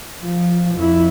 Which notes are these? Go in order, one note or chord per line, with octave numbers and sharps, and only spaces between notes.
F3
F2 E4